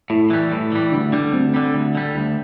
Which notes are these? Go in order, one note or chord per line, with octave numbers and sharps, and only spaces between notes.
A2 E4
E3 G3
A2
E3 G3
D2 D4
D3 G3 D4
D2 C4
D3 G3
D2
D3 G3
D2 D4